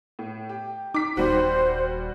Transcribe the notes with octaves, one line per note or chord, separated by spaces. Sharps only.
A2
G4
D#4 D6 B6
D#1 G3 F#4 C5